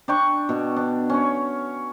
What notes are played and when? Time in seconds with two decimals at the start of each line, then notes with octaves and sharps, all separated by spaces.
0.08 D4 G5 C#6
0.49 B2
0.76 D4
1.10 C#4 C#5